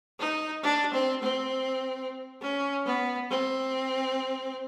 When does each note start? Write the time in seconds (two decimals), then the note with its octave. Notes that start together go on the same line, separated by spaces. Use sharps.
0.20 D#4
0.63 D4
0.94 C4
1.23 C4
2.42 C#4
2.86 B3
3.30 C4